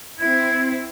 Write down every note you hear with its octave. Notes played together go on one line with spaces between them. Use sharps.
C4 E4 G#6